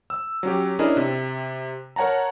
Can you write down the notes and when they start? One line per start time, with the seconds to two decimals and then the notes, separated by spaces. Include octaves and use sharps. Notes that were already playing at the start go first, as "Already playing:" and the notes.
0.10 E6
0.43 F#3 C#4 G4
0.79 C#4 D4 E4 G#4 A#4 D#5
0.97 C3
1.96 A#4 C#5 F#5 A5 A#5